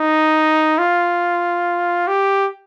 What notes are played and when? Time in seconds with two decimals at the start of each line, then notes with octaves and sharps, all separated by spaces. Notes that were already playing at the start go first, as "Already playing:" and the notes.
Already playing: D#4
0.79 F4
2.08 G4